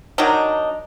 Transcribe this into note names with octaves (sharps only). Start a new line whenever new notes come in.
D#3 F#3 D4 D#4